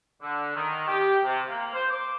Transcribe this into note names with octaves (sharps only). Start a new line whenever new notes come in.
D3
D#3
G4
C3
A#3
C5
D6